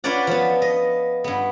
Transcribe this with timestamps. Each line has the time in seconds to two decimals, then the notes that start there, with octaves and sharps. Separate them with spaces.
0.04 D4 F4 B4 C#5 D5 F#5
0.27 F3 B3
0.62 D#5
1.24 G2 B3